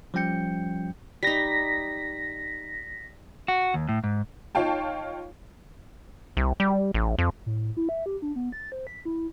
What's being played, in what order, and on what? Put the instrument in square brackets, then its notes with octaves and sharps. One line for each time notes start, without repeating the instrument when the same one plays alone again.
[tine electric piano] F3 G3 C#4 G5 G6 C#7
[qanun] G3 D#4 [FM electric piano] A#6 B6
[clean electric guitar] F#4
D#2
A2
G#2
[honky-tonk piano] D#4 F4 C#5 F5 G5 A5
[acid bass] C2
G3
A1
F2
[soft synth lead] A2
E4
E5
G4
D4
B3
A6
C5
B6
E4